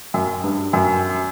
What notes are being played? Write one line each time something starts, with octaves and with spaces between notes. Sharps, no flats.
F#2
G2
F#2